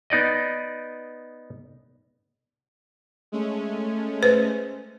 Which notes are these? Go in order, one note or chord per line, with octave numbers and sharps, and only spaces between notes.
B3 D#4 D5 D#5
G#3 A3 C#4
B4 C5